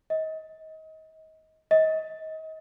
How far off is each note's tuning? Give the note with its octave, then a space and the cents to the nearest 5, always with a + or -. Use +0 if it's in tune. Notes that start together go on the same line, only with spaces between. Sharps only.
D#5 +30
D#5 +30